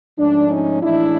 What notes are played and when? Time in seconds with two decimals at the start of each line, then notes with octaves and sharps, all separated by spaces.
0.17 G#2 F3 A3 C#4 D4
0.49 C#4 D#4
0.81 A2 E3 G#3 C#4 D4 E4